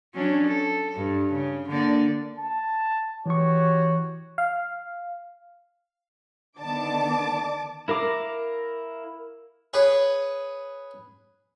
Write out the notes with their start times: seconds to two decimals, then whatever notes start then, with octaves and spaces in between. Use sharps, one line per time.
0.14 F#3 C#4 D4
0.47 A4
0.95 G2
1.33 C#3
1.69 D3 A#3 D5
2.39 A5
3.26 E3 F#4 G4 C#5 C#6
4.38 F5
6.59 D3 D#3 B3 D5 A5 D6
7.88 E4 A#4 F5 D6
9.74 G#4 B4 C#5 F#5